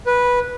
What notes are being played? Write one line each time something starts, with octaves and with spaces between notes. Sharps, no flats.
B4